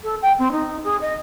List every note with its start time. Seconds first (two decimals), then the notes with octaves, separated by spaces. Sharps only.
0.03 A4
0.22 G5
0.38 C4
0.52 D#4
0.84 G#4
1.01 D#5